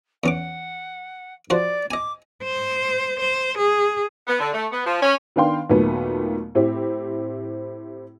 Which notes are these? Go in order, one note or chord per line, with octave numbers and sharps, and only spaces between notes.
E2 C#4 F#5 D6
F3 F#4 C5 D5
D#5 G#5 D6
C5
C5
G#4
B3
D3
A3
B3
F3
C#4
D#3 B3 D4 F5 G5 C6
D#2 A#2 F#3 A3 B3
A2 C4 E4 G4